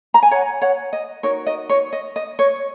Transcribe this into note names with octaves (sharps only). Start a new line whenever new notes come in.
A#5
G#5
C#5 F#5
C#5 F#5
D#5
D#4 F#4 A#4 C#5
D#5
C#5
D#5
D#5
C#5